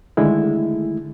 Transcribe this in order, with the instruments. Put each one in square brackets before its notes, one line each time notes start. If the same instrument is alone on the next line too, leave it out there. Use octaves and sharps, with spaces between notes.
[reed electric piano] D3 D#3 G#3 A3 E4